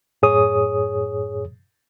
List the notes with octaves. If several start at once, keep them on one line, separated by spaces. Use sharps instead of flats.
F#2 A2 G#4 C#5 D#6